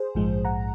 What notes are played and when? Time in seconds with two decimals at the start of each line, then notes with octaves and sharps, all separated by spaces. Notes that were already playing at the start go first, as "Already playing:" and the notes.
Already playing: G#4 C5
0.15 A#1 G#2 F3 G#3
0.45 F#5 A#5